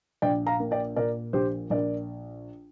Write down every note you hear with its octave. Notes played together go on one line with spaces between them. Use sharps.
A#1 D5 G5
F5 A#5
A#3
D5 G5
A#2 A#4 D5
A#1 G4 C5
A#1 A#4 D5